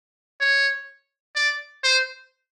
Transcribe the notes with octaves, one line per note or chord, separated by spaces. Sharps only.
C#5
D5
C5